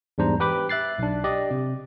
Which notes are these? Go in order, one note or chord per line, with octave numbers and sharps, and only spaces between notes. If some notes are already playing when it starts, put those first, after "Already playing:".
E2 G#2 G3 D4 C5 A#5
G4 B4 G5 B5 D6
E5 F#6 A6 C7
B1 D4
G4 D5 D#5
C3